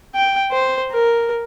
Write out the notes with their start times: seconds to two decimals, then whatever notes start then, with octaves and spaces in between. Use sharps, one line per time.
0.15 G5
0.52 C5
0.91 A#4